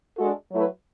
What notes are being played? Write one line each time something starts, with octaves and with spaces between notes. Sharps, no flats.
G#3 D4 F#4 A4
F#3 A3 E4 B4